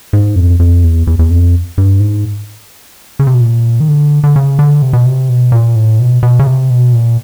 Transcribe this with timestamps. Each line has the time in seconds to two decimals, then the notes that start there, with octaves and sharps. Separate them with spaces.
0.13 G#2
0.36 F2
0.60 F2
0.84 E2
1.07 E2
1.19 E2
1.31 F2
1.78 G2
2.00 G#2
3.19 C#3
3.27 C3
3.34 B2
3.41 A#2
3.80 D#3
3.89 D3
4.24 D3
4.36 C#3
4.59 D3
4.82 C3
4.93 B2
5.06 C3
5.29 B2
5.52 A#2
5.76 A2
5.99 B2
6.23 B2
6.39 C#3
6.47 C3
6.70 B2
6.93 A#2